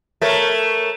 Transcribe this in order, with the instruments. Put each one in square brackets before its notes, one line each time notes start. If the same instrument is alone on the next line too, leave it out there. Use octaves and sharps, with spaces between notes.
[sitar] A3 A#4 C#5